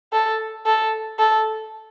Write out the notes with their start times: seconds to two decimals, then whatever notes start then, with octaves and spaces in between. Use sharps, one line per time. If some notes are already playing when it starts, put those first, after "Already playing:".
0.13 A4
0.66 A4
1.19 A4